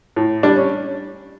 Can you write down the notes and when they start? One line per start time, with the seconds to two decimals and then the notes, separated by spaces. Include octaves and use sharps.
0.16 A2
0.43 G3 D4
0.57 C#4